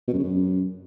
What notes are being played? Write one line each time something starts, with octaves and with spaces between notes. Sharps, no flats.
B2
F#2
C#3
F#2